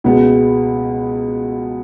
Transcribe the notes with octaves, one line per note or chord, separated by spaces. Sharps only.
C#2 B2 G#3 B3